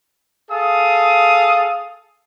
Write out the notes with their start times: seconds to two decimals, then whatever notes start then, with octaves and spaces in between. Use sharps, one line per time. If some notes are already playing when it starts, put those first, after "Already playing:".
0.50 G#4 A4 F5 D#6